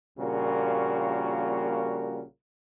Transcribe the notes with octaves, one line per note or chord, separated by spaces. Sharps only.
A#1 A#2 C#3 G3 F#4 A#4